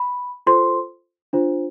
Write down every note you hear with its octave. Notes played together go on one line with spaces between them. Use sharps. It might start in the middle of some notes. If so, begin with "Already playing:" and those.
Already playing: B5
F4 A4 C5 C6
D4 F4 C5